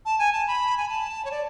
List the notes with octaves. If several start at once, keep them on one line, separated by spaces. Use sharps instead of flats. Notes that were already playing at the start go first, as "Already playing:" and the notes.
A5
G#5
A5
B5
G#5
A5
C#5
D5